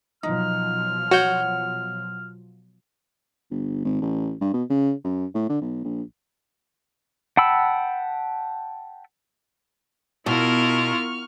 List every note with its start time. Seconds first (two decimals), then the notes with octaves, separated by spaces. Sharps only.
0.23 B2 F3 F#3 D#4 F6
1.11 F#4 C#5 F#5 G6
3.51 G1
3.85 G#1
4.02 A1
4.41 G2
4.53 B2
4.70 C#3
5.04 F#2
5.35 A2
5.49 D3
5.61 B1
5.84 A#1
7.37 F#5 G5 A5 B5 E6
10.26 B2 E4 F4 A#4 C#6 F6